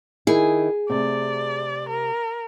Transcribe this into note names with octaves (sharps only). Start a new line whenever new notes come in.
D#3 E4 G#4
C3 A3 D5
A#4